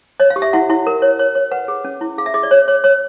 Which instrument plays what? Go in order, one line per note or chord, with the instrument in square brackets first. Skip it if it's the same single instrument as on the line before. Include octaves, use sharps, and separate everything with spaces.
[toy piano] C#5 D#5
F5
G4
E5
E4 F#5
E4
A#4
C#5
C#5
C#5
B4 F#5
G#4
C#4
E4
G#4 F5
E5
G#4 D#5
D5
C#5
C#5
C#5